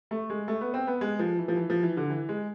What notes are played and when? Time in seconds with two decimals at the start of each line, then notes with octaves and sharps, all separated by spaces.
0.11 A3
0.30 G#3
0.48 A3
0.61 B3
0.74 C4
0.87 B3
1.01 G#3
1.19 F3
1.38 E3
1.48 F3
1.56 E3
1.70 F3
1.83 E3
1.97 D3
2.10 E3
2.29 G#3